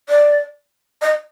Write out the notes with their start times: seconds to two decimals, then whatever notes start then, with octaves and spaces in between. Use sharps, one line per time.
0.09 D5
1.02 D#5